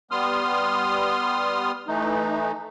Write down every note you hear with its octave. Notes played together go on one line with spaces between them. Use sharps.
G3 B3 C6 D#6 F6
E3 A3 D#4